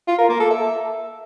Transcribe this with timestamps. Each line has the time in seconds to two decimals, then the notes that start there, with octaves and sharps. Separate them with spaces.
0.08 F4
0.18 A#4
0.29 A#3
0.40 A4
0.50 E5